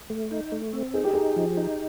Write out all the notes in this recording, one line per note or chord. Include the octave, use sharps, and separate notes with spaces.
A3
D#4
A3
C4
D#4 G#4
G4
D#4 G#4
F3
D#4